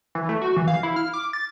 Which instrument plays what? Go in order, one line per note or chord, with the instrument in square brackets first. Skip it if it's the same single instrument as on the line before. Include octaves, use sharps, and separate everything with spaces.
[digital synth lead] E3
A3
F#4
E3
F5
E4
F6
D6
A6